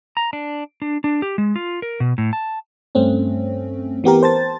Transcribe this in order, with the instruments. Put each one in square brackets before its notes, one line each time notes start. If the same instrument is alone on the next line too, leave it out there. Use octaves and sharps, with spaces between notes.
[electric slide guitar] A#5
D4
D4
D4
G4
G#3
F4
A#4
B2
A2
A5
[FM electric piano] G2 A3 C4 C#4
E3 B3 G4 A#4
C5 A5 A6